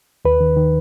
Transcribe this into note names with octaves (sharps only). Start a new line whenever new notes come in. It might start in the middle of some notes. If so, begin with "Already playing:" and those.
D#2 B4
D#3
D#3